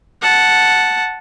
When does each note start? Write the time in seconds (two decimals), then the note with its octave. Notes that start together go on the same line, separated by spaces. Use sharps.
0.22 F#5 A5